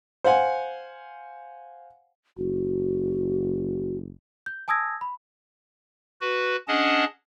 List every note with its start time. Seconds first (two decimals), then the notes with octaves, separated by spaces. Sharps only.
0.24 C5 F5 F#5 G#5
2.37 F#1 F#4
4.46 G6
4.68 G#5 A5 D#6 E6 G#6 A#6
5.01 B5
6.21 F#4 B4
6.68 C#4 D4 G#4 D#5 F#5 A5